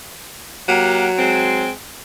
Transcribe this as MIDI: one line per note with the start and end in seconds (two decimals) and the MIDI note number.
0.68 1.66 54
0.68 1.07 58
0.68 1.07 67
0.68 1.07 78
1.18 1.70 56
1.18 1.70 60